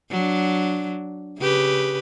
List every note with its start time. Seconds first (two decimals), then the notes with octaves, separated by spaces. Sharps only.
0.10 F#3 D4
1.39 C#3 G4 B4